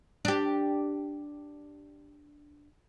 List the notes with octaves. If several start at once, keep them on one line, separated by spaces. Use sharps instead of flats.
D4 G4